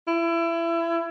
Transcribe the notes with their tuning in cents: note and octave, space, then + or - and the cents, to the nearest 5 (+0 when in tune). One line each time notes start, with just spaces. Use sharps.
E4 +25